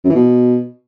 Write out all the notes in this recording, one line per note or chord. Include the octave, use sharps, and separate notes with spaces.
F#2
E3
B2